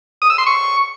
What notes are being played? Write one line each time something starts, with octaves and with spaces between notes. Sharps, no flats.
D#6
E6
C6
C#6